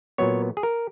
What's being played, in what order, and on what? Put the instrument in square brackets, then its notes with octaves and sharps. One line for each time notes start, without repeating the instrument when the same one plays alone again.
[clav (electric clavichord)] A#2 F#3 B3 C#5
G#4
A#4